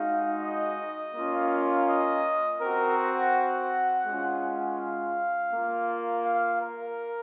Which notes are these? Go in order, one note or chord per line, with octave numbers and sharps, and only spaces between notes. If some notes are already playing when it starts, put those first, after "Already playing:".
Already playing: G#3 D#4 F#4 F5
D#5
A#3 C#4 F4
D#5
C4 F#4 A#4
F#5
G#3 C#4 F4
F5
A#3 F4
F5
A#4